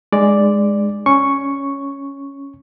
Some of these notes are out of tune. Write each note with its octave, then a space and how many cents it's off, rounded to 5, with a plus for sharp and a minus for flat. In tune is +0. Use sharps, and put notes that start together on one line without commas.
G#3 -5 D#4 -40 D5 +0
C#4 +0 C#6 +0